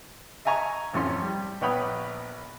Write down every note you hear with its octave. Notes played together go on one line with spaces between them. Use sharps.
D#5 E5 G#5 A#5 C#6
A1 F2 C#4 C6
G3
A#1 B3 C#5 G5 B5 D#6